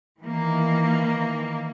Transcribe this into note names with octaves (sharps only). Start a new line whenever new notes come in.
D#3 E3 A#3